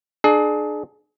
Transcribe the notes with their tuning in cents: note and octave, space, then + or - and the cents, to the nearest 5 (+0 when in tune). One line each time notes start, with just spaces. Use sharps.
D4 +35 G#4 +30